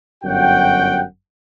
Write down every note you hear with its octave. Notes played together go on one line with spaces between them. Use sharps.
G1 F#2 F#4 F#5 G5